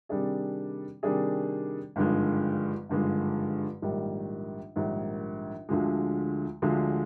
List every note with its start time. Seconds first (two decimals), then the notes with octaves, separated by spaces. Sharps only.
0.09 C3 D#3 G3 D4 G#4
1.03 C3 D#3 G3 D4 G#4
1.96 G#1 G2 D3 F3 G#3
2.89 G#1 G2 D3 F3 G#3
3.82 A#1 G#2 D#3 G3
4.76 A#1 G#2 D#3 G3
5.69 D2 D3 F3 G#3
6.62 D2 D3 F3 G#3